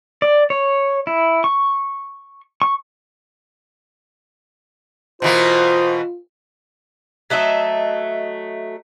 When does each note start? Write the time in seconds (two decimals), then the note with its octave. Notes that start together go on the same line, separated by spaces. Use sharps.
0.22 D5
0.50 C#5
1.07 E4
1.44 C#6
2.62 C#6
5.22 B2 E3 A#3 F4 C5
7.30 F#3 A3 D#5 E5